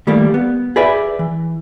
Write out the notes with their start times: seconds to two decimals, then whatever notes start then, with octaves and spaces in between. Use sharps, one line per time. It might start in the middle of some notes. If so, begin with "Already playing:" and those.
0.07 D#3 G3 A3 A#3
0.34 B3
0.76 G#4 B4 D5 E5
1.19 E3